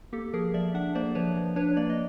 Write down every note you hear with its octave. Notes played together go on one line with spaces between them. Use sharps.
A#3 G4 A4
F3 G#4 A#4
F3 D5 E5
D4 E5 F#5
A#3 C5 D5
F3 B4 C#5
F3
D4 B4 C#5
A#3 D5
D#5